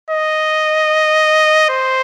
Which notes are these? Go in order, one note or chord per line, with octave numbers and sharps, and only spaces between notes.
D#5
C5